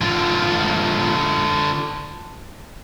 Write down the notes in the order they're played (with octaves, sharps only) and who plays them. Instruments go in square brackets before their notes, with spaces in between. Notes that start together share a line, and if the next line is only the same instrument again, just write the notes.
[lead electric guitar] D3 F4